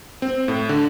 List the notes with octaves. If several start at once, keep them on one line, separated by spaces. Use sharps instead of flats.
C4
A2
D3